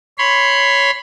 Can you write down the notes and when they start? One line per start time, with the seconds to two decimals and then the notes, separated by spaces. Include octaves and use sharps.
0.18 C#5 B5 C6